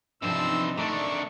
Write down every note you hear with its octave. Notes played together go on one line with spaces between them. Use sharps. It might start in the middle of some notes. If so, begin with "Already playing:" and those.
C3 E3 F3 C4 D4 D#4 C5 E6
D#3 A3 D4 C#6